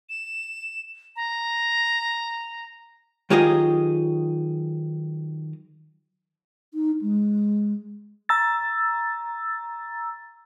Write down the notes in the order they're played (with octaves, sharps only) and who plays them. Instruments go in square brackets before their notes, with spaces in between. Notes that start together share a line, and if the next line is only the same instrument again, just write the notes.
[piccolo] E7
A#5
[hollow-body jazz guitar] D#3 F#3 F4 G4 G#4 D#5
[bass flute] D#4
G#3
[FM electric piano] A#5 E6 A6